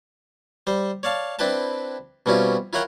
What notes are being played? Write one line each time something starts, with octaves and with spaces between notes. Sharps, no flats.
G3 C5
C#5 D5 F5 A5
C4 D4 E4 B4 G5 A5
B2 G3 C4 C#4 E4 F4
E4 F4 A#4 C#5 F#5 G5